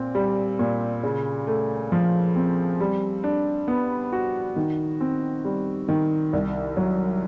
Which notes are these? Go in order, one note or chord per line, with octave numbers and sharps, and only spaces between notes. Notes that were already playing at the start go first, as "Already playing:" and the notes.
Already playing: A#2 C4
G3
A#2
C#3
A3
F3
C4
G3
D4
B3
F#4
D#3
C4
G3
D#3
C2
F#3